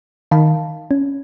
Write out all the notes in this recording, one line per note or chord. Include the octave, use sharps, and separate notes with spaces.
D#3 F5 A5 B5
C#4